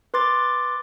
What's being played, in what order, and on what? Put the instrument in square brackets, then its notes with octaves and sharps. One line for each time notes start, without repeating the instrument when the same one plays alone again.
[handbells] B4 C6 D6 A6